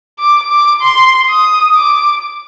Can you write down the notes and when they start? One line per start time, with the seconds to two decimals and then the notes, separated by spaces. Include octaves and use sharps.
0.19 D6
0.51 D6
0.82 C6
1.29 D#6
1.76 D6